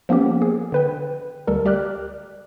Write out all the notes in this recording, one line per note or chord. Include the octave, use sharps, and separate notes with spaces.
F3 A#3 B3 C#4 G4
G#4
D3 B4 G5
D2 G3 A4 A#4
G4 D5 D6 F6 F#6